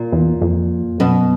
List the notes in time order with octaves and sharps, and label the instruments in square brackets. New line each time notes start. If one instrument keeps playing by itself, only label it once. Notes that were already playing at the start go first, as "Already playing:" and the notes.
Already playing: [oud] A#2 A#3
[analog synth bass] E2
F2
[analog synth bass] F#2 [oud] B2 B3